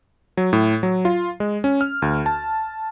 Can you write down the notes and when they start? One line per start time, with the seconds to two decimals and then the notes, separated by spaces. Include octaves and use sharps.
0.37 F#3
0.53 A2
0.83 F#3
1.05 F4
1.40 G#3
1.64 C#4
1.81 F6
2.02 D2
2.26 A5